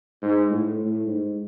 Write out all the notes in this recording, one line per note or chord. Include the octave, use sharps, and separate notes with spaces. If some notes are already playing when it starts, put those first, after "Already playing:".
G#2
A2
A2
G#2